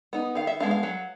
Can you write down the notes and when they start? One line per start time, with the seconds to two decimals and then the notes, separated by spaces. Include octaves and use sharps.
0.13 B3 D#4
0.35 D#3 F5
0.47 E5
0.60 G#3 B3 D4 F5
0.71 F5
0.83 F#3